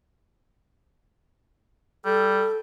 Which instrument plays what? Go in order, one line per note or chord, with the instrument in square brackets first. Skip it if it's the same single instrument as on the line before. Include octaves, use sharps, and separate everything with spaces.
[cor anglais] G3 [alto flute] A4